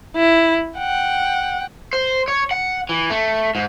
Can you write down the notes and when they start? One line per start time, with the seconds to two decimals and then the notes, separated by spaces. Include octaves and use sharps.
0.16 E4
0.78 F#5 G5
1.93 C5
2.28 C#5
2.51 F#5
2.89 E3
3.10 A3
3.55 G#2